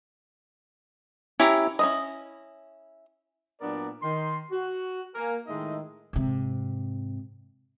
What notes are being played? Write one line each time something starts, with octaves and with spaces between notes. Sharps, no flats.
C#4 E4 G4 A#5
C#4 E4 D#5
A#2 F#3 B3 D4 A#4 D5
D#3 C6
F#4
A#3 A#4 G#5
A2 D#3 G#3 D#4 D#5 E5
G#2 C3